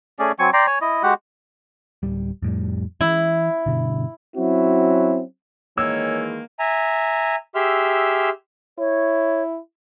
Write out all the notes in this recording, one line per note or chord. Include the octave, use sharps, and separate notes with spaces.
A3 C#4 G#4 D5
F#3 C4 G#5 C#6
D5 G5 A#5 C6
C#5 G#5
E4 D#5
G#3 F#4 G4 F#5
D1 G3
F2 A2 G3
E3 E4
G2 B2 D3
F#3 C4 C#4 E4 F#4
D#3 E3 G#3 A#3 C#5 E6
E5 G#5 A#5
G4 G#4 E5 C6 E6 F6
E4 C#5